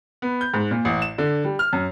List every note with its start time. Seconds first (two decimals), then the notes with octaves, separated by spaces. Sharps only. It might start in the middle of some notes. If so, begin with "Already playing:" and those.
0.22 B3
0.41 G6
0.54 G#2
0.71 A#2
0.85 A1
1.02 E7
1.18 D3
1.44 G3
1.59 F6
1.73 F#2